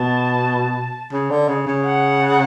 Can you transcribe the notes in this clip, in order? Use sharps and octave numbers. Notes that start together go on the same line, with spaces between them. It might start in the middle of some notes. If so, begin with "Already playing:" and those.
Already playing: B2 A5
C#3
D3
C#3
C#3
F#5